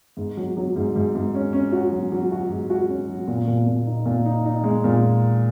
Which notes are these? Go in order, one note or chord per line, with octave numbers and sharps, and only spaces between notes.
G#2
F#3
F#3
G#2
G#2
G#2
C#4
C#4
F#4
F#3
F#3
F#4
G#2
F#4
C#4
F#3
A#2
A#2
A#2
D#4
A#2
D#4
D#4
G#3
A#2